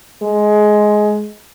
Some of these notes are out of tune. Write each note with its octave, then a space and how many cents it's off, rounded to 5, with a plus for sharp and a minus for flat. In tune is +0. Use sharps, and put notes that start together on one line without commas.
G#3 +15